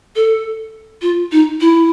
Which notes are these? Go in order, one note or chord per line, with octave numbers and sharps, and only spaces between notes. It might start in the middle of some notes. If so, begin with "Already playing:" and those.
A4
F4
D#4
E4